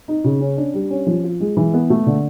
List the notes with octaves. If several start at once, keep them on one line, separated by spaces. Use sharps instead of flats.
D#4
C#3
C#4
D4
G3
C#4
F3
F4
G#3
E3
B3
A3
D3